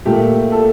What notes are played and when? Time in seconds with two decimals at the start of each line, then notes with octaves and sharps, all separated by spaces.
0.05 A#2 A3 G4
0.52 A4